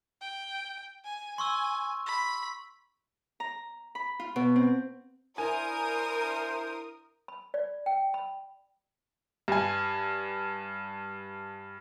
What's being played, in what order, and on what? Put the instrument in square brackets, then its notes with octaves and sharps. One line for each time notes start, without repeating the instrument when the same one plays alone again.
[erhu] G5
G#5
[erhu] G#5 [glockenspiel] C6 C#6 E6
[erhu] B5
[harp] A#5
B5
F4
B2
C4
[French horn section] D4 E4 [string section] A#4 D#6 [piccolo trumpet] C5 [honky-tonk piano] G#5
[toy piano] B5
D5
G5
B5
[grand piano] G2 G#5